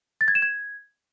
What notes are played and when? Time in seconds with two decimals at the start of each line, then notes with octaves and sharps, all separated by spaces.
0.21 A6
0.28 G#6
0.35 E7
0.42 G#6